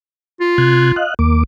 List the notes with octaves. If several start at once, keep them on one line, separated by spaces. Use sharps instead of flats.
F4
C3 F#6 G#6
D#5 F5 F#6
D#2 A#3 D6